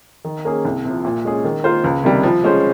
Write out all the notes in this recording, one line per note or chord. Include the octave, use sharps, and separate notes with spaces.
D#3
A#3 C#4 G#4
C2
C3 F3
A#2
G#3 C#4 G#4
D#3
A#3 F4 C5
C#2
C3 D#3 G3
F3
G#3 C#4 G#4 C5